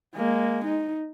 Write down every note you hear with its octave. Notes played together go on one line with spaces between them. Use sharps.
G#3 A#3
D#4